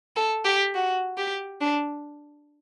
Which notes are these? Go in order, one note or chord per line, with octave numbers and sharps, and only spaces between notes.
A4
G4
F#4
G4
D4